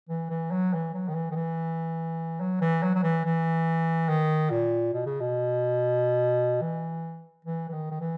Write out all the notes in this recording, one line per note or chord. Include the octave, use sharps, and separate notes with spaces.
E3
E3
F#3
E3
F#3
D#3
E3
D#3
E3
F#3
E3
F#3
F#3
E3
E3
D#3
A#2
B2
C#3
B2
E3
E3
E3
D#3
D#3
E3